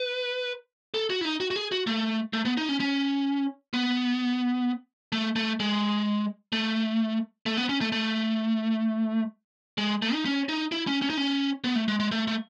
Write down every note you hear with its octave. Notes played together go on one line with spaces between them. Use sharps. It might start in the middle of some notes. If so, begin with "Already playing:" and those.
Already playing: B4
A4
F#4
E4
D#4
F#4
F#4
G#4
F#4
A3
A3
B3
D#4
C#4
C#4
B3
A3
A3
G#3
A3
A3
B3
C#4
A3
A3
G#3
A3
D#4
C#4
D#4
E4
C#4
C#4
D#4
C#4
B3
A3
G#3
G#3
A3
A3